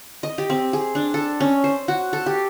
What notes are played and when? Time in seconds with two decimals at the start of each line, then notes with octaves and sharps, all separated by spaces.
0.23 D#5
0.38 G4
0.50 C4
0.73 G#4
0.95 D4
1.14 A4
1.40 C#4
1.64 C5
1.88 F#4
2.13 A4
2.26 G4